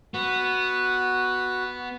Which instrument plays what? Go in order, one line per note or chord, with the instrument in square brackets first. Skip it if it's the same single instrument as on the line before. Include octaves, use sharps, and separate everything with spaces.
[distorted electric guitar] B3 [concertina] F#4